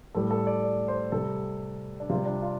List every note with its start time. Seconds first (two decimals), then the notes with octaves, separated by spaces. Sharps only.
0.15 A2 G3 A4
0.31 A4
0.47 D5
0.63 D5
0.88 C5
1.12 C3 G3 A4
2.00 D4
2.09 C3 G3 F4
2.26 D4
2.42 F4